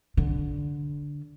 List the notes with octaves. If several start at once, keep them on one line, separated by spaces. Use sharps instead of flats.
D3